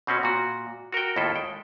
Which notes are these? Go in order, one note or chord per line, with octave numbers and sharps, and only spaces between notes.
B2 C4 C#4 F#4
A#2 F#4
F#4 A#4 F#5 G5
D#2 A2 E4 F4 A4
G#3 G5